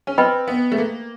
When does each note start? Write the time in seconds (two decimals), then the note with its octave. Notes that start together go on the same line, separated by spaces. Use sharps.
0.07 C#4
0.18 C4 B4 D#5 G5 B5
0.48 B3
0.72 A3
0.78 A#3